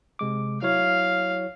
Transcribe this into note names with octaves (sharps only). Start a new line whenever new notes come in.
C3 G#3 D6
F#3 E4 C#5 F5